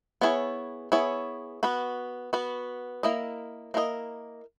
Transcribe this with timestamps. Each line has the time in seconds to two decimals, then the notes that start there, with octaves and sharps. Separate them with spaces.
0.21 B3 E4 G#4 C#5
0.92 B3 E4 G#4 C#5
1.63 B3 F#4 B4
2.33 B3 F#4 B4
3.03 A#3 E4 A#4 D#5
3.74 A#3 E4 A#4 D#5